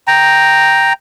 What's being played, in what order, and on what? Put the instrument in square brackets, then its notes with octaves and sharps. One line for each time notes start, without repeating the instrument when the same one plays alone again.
[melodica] G5 A#5